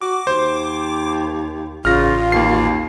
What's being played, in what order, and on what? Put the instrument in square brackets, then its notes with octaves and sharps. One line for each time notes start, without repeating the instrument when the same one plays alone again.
[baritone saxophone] F#4 [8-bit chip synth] D6
[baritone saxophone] D#2 [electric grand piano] C5
[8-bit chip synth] A1 [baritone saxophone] C#3 [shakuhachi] F4 [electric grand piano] F6 A#6
[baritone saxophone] D#2 [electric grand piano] A#3 C7